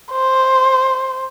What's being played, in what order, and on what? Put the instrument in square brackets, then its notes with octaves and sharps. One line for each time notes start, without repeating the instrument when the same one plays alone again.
[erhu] C5